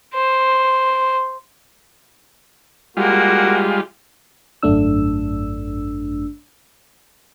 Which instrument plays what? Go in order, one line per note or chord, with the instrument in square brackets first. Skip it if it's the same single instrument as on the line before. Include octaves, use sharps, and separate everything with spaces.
[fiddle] C5
[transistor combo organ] G3 G#3 F4 [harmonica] A#3 F#4
[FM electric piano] G#1 F#2 A3 D4 E6